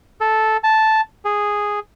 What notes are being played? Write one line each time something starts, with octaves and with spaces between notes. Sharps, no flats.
A4
A5
G#4